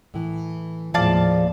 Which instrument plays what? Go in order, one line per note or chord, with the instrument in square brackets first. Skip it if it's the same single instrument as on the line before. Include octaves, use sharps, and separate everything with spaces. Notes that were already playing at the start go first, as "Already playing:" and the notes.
[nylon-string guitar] A2 E3
[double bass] D#2 A2 [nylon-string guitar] F3 G#3 [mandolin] D5 F5 A5